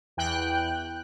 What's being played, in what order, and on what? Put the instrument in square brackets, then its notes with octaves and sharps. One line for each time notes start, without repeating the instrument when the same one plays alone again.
[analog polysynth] E2 G5 F#6